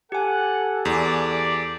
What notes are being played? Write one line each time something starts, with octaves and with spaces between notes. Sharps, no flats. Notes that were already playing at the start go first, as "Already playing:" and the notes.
G4 A4 F#5 G#5
E2 D5